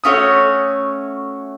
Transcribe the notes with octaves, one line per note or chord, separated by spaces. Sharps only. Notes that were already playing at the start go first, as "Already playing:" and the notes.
A3 C#4 F#4 C#5 D#6